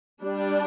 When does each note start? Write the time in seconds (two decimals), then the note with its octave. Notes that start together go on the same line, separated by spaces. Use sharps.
0.21 G3 D4